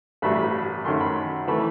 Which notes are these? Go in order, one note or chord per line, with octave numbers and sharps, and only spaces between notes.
A1 G2 F#3 A3 B5
B5
F#2 D#3 F#3 A3 C6
B5
E3 A3 B5